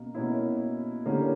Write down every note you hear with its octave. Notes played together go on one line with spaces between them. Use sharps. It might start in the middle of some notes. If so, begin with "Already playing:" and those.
Already playing: B2 A#3 C#4
B2 A#3 C#4 E4
D3 A#3 C#4 E4 G4